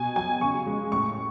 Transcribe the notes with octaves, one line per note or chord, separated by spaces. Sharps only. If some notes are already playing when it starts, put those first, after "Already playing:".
Already playing: B2 G#5
F#3 G#5
C#3 C#6
G#3
A2 C#6